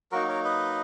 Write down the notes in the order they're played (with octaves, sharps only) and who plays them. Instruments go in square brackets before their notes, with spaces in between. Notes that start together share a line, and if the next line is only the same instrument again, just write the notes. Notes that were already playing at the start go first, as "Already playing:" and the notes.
[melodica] F#3 A#3 D#4 F#4 A#4
A#4 C#5
B4 D#5